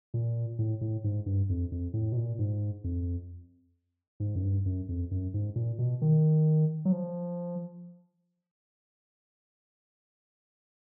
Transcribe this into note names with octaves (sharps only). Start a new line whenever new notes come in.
A#2
A2
A2
G#2
G2
F2
F2
A2
B2
A#2
G#2
F2
G#2
F#2
G2
F#2
F2
F#2
G#2
A#2
B2
D#3
F#3
F3